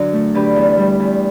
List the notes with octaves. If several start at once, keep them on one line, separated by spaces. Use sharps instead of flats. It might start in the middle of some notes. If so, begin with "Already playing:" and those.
Already playing: F#2 D3 F#3
A3
D3 G4 B4
E2
G3
E2